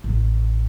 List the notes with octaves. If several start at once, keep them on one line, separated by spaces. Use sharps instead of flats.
A1